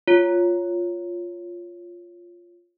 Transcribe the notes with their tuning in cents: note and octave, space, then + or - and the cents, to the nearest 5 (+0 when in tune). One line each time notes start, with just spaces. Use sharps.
F4 +0 C#5 +5